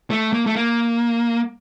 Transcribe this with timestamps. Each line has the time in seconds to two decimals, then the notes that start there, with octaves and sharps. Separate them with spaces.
0.10 A3
0.33 A#3
0.46 A3
0.56 A#3